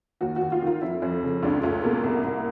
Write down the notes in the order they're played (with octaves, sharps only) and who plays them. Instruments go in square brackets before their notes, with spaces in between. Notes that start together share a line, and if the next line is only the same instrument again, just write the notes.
[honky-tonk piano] D#2 F#4
F#4
D#2
F4
D#3 F4
F2 E4
F2
C#3
C#2 D4
C#2 A3
B2 A#3
C2
C2